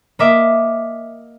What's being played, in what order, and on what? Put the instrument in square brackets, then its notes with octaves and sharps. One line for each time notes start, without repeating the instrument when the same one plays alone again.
[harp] A#3 D#5 E5 D6